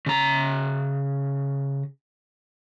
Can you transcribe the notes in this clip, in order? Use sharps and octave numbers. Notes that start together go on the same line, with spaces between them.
C#3 A#5